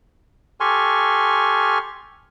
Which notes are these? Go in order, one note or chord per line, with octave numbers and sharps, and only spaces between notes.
G4 A4 G#5 C6 C#6 F6